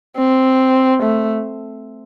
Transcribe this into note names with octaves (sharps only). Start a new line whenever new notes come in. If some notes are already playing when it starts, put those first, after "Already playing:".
C4
A3